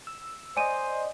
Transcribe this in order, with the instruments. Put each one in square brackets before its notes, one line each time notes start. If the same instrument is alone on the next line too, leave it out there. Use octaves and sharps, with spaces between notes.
[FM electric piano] E6
[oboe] C5 [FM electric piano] D5 D#5 [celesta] G#5 D#7